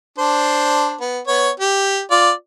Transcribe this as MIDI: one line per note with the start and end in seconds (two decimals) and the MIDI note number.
0.19 0.95 62
0.19 0.95 72
1.01 1.19 59
1.27 1.50 59
1.27 1.50 73
1.60 2.01 67
2.11 2.31 65
2.11 2.31 74